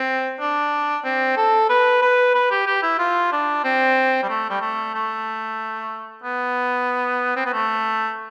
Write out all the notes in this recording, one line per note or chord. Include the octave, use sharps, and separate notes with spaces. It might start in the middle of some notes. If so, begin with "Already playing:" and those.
Already playing: C4
D4
C4
A4
B4
B4
B4
G4
G4
E4
F4
D4
C4
G3
A3
G3
A3
A3
B3
C4
B3
A3